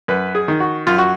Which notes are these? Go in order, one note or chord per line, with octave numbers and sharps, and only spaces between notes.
F#2 B4
G#4
D#3
F#4
F#2 F4
F#4